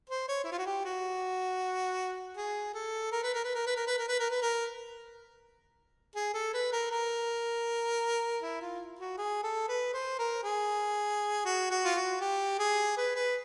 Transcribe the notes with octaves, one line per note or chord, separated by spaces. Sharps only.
C5
C#5
E4
F4
F#4
G4
F#4
G#4
A4
A#4
B4
A#4
B4
A#4
B4
A#4
B4
A#4
B4
A#4
B4
A#4
G#4
A4
B4
A#4
A#4
E4
F4
F#4
G#4
A4
B4
C5
A#4
G#4
F#4
F#4
F4
F#4
G4
G#4
B4
B4